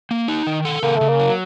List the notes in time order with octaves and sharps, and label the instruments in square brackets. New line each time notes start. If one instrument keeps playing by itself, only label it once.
[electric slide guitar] A#3
D#4
D#3
A4
[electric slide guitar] C#3 [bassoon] A#3
[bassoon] A3
[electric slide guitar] C#3
[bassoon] A#3
[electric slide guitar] F#3